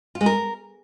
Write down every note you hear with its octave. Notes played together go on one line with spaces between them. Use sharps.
F4
G#3
A#4